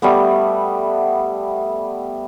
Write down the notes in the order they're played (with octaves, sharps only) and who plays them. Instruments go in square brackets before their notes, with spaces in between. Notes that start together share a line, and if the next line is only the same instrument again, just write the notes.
[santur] G3 A3 B3